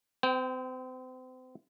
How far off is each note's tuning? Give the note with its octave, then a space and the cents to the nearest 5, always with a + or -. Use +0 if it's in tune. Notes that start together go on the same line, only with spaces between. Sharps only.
C4 -35 G5 +0